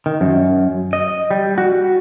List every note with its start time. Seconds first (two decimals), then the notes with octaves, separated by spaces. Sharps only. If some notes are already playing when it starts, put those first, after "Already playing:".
0.06 D#3
0.21 F#2
0.93 D#5
1.31 G3
1.58 F#4